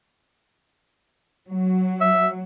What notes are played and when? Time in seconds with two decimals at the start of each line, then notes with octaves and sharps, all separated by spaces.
1.48 F#3
2.01 E5